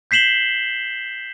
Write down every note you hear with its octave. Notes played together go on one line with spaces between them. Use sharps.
G6 B6 C7 E7 F#7 G7